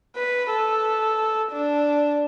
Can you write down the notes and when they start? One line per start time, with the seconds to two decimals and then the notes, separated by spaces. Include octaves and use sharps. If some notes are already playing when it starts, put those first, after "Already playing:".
0.16 B4
0.50 A4
1.52 D4